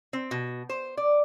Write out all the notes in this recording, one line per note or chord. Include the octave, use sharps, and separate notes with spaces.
C4
B2
C5
D5